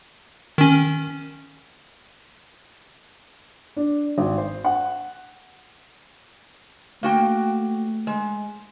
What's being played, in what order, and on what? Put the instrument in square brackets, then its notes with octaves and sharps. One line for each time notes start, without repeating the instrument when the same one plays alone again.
[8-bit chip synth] D#3 C#4
[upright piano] D4
G#1
C5
F#5
[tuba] A3 [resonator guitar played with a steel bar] A#3 F#4 G5
[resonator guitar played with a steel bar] G#3